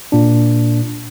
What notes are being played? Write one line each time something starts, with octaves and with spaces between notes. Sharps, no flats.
A#2 D4